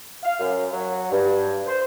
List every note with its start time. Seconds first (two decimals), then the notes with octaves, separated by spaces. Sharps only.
0.23 F5
0.39 F#2
0.72 F#3
1.11 G2
1.67 C5